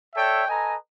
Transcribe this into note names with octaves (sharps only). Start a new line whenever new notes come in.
A4 C#5 D5 E5 G5
A4 B4 D#5 G#5 A#5